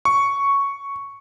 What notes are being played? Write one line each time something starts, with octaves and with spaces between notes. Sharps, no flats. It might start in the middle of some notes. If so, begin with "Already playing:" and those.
C#6